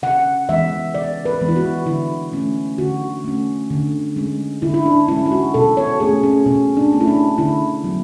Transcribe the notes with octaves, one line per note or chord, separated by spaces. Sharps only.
C#3 F#5
E3 G#3 B3 E5
C#3 D5
B4
E3 G#3 B3
E4
F#4
D3 E4
A3 C#4
D3 F#4
A3 C#4
D3
G#3 C#4
D3 E4
E4
D4
G#3 C#4 E4
E4
F#4
B2 A4
C#5
A3 C#4 G#4
C#4
B2 C#4
D4
A3 C#4
E4
D4
D3 E4
F#3 B3